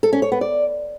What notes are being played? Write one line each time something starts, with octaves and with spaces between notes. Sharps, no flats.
A4
C#4
C#5
B3
D5